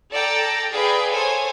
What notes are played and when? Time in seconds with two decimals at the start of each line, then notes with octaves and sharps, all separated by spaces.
0.13 A4 D5 G5 A#5 A6
0.72 G#4 B4 D5 F5 G5
1.13 A4 C5 C#5 G#5